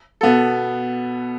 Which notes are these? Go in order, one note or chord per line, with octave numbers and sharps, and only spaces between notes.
B2 B3 A4